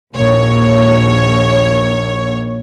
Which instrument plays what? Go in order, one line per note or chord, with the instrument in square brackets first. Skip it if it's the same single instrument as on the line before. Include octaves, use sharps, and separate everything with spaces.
[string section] A#1 D#2 C#5